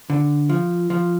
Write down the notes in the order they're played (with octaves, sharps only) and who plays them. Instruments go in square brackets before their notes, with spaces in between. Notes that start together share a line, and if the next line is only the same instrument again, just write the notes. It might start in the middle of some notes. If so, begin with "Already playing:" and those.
[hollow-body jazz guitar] D3
F3
F3